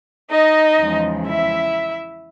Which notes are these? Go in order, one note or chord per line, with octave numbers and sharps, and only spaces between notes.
D#4 D#5
E2 C#3 F3 G#3
E4 E5